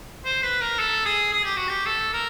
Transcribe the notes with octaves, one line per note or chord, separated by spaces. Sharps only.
C5
B4
A#4
A4
G#4
G#4
G4
F#4
G4
A4
A#4